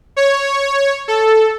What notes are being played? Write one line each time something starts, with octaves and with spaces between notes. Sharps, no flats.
C#5
A4